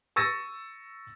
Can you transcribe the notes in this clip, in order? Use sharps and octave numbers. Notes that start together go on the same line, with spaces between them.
C#6 E6 A6 A#6 D#7